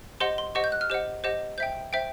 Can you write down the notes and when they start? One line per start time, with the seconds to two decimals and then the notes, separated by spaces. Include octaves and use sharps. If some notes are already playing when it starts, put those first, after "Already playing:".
0.20 G4 C5 D#5 F#5 C6
0.38 C6
0.55 G4 C5 D#5 F#5 C#6
0.64 G6
0.72 F#6
0.81 F6
0.90 G4 C5 D#5 F#5
1.24 G4 C5 D#5 F#5
1.58 C5 E5 G5 G6
1.93 C5 E5 G5